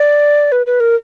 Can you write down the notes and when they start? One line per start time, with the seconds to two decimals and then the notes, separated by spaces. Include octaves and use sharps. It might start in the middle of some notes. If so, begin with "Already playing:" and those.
Already playing: D5
0.52 B4
0.66 B4
0.80 A#4